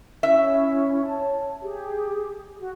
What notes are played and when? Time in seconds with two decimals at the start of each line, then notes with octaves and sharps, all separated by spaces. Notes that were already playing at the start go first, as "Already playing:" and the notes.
0.23 C#4 E4 E5
1.05 C#5 A5
1.62 G4 G#4
2.59 F#4